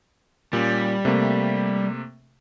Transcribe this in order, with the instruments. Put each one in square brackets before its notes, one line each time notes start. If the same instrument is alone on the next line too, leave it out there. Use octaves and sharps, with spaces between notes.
[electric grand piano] A#2 C#4 [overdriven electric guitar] G3
[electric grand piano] C3 A3 A#3